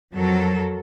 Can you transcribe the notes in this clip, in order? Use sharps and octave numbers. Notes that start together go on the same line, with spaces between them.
F2 F#3 A4 A#4